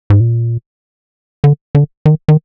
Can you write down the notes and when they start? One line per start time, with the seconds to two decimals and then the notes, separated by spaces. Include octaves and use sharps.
0.10 G#2
0.20 A#2
1.44 D3
1.75 D3
2.06 D#3
2.28 D#3